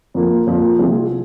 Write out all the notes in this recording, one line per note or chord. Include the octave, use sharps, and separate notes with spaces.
F2 F3 A#3
F2 F3 A#3
C2 C3 F3 C4 G#4